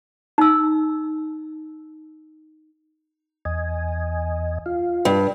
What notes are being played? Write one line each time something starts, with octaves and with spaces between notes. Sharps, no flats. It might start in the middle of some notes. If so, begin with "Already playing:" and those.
D#4 E6
E2 D#5 G#5
F4 F5
G2